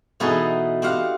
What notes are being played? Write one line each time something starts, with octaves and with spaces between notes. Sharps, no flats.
B2 E3 B3 D#4 G#4 A4
C4 G4 F5 F#5